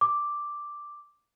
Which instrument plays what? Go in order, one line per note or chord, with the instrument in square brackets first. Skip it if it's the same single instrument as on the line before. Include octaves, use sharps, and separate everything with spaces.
[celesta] D6